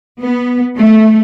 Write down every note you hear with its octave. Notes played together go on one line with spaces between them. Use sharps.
B3
A3